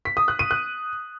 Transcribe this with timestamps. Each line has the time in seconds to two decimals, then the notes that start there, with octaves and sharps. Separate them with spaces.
0.05 B6
0.17 D#6
0.28 F#6
0.39 D#7
0.51 F#6